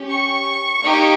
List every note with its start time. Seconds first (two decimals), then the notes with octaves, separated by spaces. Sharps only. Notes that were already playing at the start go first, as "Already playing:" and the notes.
Already playing: C#4 G4
0.10 C#6
0.84 A#3 D#4 G4